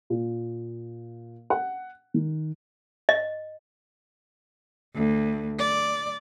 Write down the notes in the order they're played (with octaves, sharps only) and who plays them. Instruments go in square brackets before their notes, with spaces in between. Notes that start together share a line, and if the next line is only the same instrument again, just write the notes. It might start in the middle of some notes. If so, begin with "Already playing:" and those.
[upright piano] A#2
F#5
D#3
[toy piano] D#5
[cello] D2
D5